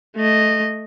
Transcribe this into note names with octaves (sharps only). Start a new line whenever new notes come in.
A3 D#5